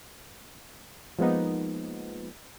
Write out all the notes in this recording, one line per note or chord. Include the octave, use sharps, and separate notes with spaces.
F3 G#3 A#3 B3 D#4